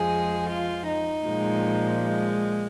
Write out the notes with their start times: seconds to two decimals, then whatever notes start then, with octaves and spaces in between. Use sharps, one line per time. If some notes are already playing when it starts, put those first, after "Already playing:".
Already playing: F2 F3 G#3 G#4
0.49 F4
0.87 D#4
1.27 A#2 F3 G#3
2.05 G#3